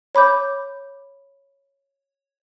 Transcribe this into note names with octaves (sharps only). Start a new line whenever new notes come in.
C#5 B5 D6 G6